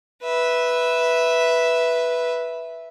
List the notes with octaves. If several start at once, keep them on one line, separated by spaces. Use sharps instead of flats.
B4 E5